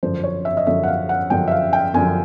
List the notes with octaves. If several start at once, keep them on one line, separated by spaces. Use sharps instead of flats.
F#2 D3 F3 C5
C#5
E5
D#5
F#2 D3 F3 E5
F#5
F5
F#5
F#2 D3 F3 G5
E5
F5
G5
F#2 D3 F3 G#5